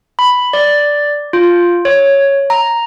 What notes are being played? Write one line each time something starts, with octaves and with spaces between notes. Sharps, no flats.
B5
D5
F4
C#5
A#5